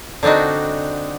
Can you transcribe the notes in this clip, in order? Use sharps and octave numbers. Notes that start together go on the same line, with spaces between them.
D3 C4 D4 D#4 F#4